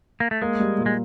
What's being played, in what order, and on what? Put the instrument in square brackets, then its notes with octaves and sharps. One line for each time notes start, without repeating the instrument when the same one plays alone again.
[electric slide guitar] A#3
A3
[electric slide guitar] G#3 [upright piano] A#3
[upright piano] G3
A#2
[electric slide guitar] G#3